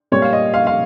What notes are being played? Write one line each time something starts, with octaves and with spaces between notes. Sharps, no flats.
A#2 G3 A#3 C#5
F5
D#5
F5
F5